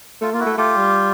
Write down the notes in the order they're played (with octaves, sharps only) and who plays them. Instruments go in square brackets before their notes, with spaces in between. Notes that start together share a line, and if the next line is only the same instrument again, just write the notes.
[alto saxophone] A3 [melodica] F4
[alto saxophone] A#3 [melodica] F4
[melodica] E4 F#4
[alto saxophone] A3
[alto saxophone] A3 [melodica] F4 G4
[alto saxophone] G3